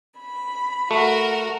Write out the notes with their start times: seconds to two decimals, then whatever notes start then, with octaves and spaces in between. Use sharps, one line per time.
0.18 B5
0.91 A3 F#4 A#4